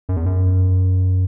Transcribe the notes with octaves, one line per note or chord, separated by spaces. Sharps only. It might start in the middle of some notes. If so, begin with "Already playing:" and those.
F#2
E2
F#2